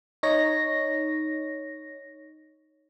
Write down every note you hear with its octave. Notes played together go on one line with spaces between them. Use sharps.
D#4 C#5 A#6